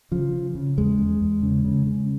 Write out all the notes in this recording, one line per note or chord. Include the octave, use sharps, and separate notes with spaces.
C#3 F3
C#3
C#3
E2 G#3
E2
E2
C#3
C#3
C#3